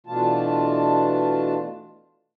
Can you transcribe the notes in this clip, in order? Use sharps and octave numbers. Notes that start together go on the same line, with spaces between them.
B2 E3 A3 D4 F4 A5